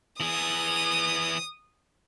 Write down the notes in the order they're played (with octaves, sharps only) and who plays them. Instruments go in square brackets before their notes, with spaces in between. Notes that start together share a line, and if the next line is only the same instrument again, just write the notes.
[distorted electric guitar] E3 G#4 [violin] D#6